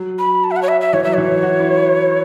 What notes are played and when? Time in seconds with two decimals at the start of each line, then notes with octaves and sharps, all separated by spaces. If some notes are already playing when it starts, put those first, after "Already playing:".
Already playing: F#3
0.19 B5
0.44 A5
0.51 E5
0.56 F#5
0.63 C#5
0.68 E5
0.81 E5
0.93 E3 C#5
1.04 F#3 E5
1.14 E3 C#5
1.43 F#4
1.60 E4
1.76 E4